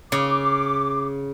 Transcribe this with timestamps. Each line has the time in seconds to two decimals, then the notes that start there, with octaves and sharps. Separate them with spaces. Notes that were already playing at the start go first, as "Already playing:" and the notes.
0.12 C#3 D6